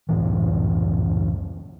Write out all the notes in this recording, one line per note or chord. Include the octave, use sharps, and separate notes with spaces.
C#2 F#2 A2 E3